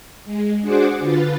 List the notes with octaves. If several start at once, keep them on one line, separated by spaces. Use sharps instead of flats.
G#3
D4 F#4 G#4 C5 F#5 D6
D3 F4 B4 A6